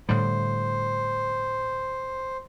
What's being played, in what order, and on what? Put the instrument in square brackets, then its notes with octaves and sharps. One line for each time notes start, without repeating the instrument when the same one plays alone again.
[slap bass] A2 D3 G3 [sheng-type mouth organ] C5